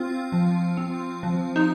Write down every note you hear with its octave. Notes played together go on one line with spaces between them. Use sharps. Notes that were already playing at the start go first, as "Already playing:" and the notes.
Already playing: C4 F4
F3
C4
F3
D#4